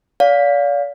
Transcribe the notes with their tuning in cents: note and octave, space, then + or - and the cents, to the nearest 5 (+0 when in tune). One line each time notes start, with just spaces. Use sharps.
D5 -40 F5 +15